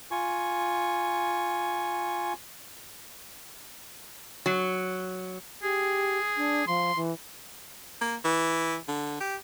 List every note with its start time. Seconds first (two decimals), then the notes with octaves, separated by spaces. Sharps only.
0.11 F4 G#5 C#6
4.46 F#3
5.63 G4 G#4
6.37 D4
6.67 F3 C6
6.96 E3
8.01 A#3
8.25 E3
8.88 D3
9.20 G4